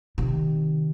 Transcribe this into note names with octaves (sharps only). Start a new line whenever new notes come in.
C3 D#3